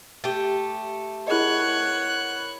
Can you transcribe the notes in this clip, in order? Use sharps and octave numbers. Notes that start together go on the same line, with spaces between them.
A3 G4
E4 G#4 A#4 C#5 D#5 F#5 B5 F#6